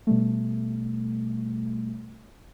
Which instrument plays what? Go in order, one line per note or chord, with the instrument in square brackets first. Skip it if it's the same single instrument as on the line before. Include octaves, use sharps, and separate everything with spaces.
[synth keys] B2 G3 A3